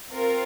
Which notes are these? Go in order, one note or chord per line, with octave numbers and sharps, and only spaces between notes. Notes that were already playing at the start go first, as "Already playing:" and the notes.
C4 F4 A#4